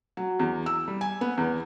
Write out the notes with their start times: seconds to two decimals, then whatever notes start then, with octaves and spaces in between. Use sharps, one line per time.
0.17 F#3
0.40 E2
0.66 E6
0.88 G3
1.01 G#5
1.21 B3
1.38 E2